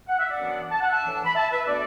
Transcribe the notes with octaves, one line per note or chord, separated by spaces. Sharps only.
F#5
E5
D5 F#5
F#2 E3 B3 D4
A5
F#5
E5 A5
A2 E3 D4
B5
E5 A5
B4 E5
B2 A3 D4 A4 D5